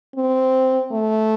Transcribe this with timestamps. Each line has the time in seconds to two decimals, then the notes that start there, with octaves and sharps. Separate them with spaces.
0.16 C4
0.92 A3